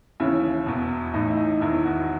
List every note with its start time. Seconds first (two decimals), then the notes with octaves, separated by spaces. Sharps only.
0.20 D#2 C#3 E3 E4
0.66 E1 E2 B2
1.14 A1 A2 E3 D#4
1.27 E4
1.37 D#4
1.61 E1 E2 D#3 E4
1.85 F#4